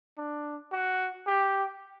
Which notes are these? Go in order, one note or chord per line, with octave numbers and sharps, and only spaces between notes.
D4
F#4
G4